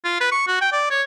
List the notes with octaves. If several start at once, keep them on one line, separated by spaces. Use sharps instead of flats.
F4
B4
C#6
F#4
G5
D5
C#5